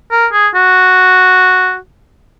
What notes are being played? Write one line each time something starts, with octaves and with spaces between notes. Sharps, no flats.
A#4
G#4
F#4